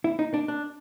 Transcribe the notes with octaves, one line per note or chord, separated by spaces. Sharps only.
E4
D#4
D4
D4